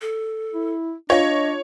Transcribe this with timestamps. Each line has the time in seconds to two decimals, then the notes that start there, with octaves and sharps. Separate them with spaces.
0.02 A4
0.53 E4
1.10 D4 F4 C#5 D#5 F5